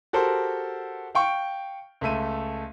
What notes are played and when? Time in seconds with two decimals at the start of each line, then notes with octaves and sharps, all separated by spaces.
0.13 F#4 G4 A4 A#4 C5
1.15 F5 G5 C#6 D7
2.01 C#2 A3 E5 D#7